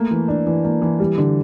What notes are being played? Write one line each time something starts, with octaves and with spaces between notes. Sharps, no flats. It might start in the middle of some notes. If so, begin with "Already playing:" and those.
Already playing: A3 A#3
E3
D4
E3
A#3
E3
G3
D3